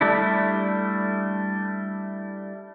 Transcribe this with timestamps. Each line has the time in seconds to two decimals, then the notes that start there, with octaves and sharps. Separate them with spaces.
0.01 G3 A3 D4 E4